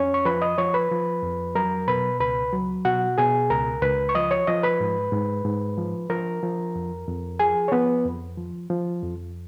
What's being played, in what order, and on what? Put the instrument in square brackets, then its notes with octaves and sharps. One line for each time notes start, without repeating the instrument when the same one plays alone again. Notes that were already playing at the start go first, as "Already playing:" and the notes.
Already playing: [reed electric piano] F2 C#4 C#5
C#6
F3 B4 B5
D#5 D#6
F3 C#5 C#6
B4 B5
F3
F2
F#3 A#4 A#5
B2 B4 B5
C#2 B4 B5
F#3
B2 F#4 F#5
B2 G#4 G#5
C#2 A#4 A#5
C#2 B4 B5
C#6
F3 D#5 D#6
C#5 C#6
F3 D#5 D#6
B4 B5
G#2
G#2
G#2
F3
F3 A#4 A#5
F3
F2
F2
F3 G#4 G#5
C#5
F3 B3 B4
F2
F3
F3
F2